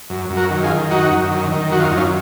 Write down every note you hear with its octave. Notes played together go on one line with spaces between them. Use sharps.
F#2
F#2
F#4 A#4
D#3
F4 G#4
D#3
F#2 D#4 F#4
F#2
D#3
D#3
F#2 F#4
F4
F#2 D#4
C#4 F4